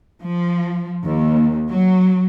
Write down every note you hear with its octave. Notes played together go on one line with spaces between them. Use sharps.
F3
D#2
F#3